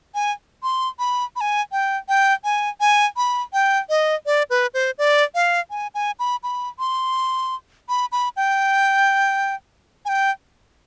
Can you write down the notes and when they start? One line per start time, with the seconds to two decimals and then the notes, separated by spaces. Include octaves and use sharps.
0.15 G#5
0.63 C6
0.99 B5
1.36 B5
1.41 G#5
1.72 G5
2.08 G5
2.44 G#5
2.80 G#5
3.17 B5
3.53 G5
3.89 D#5
4.26 D5
4.50 B4
4.74 C5
4.98 D5
5.35 F5
5.71 G#5
5.95 G#5
6.19 B5
6.43 B5
6.79 C6
7.89 B5
8.12 B5
8.37 G5
10.05 G#5
10.09 G5